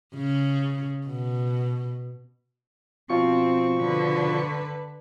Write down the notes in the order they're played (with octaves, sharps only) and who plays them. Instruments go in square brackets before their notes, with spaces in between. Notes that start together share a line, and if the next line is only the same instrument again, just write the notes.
[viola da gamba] C#3
B2
[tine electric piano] B2 F3 F4 [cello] C4 [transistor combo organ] C#6
[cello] D3 B4